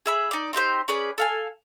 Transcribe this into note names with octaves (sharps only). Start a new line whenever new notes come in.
G#4 E5 B5
D#4 D5
C4 D#4 G4 C5
C#4 G#4 B4 D5
A4 F5 G#5